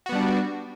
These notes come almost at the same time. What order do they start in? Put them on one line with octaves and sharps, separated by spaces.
F#4 B3 G3 D4